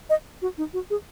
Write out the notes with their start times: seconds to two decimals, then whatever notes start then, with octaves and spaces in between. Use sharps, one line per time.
0.10 D#5
0.42 F#4
0.58 D#4
0.73 F#4
0.90 G#4